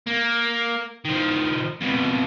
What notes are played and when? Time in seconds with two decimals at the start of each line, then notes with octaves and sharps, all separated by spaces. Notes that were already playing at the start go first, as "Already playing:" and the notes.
0.07 A#3
1.05 D#3 F3
1.81 F2 B2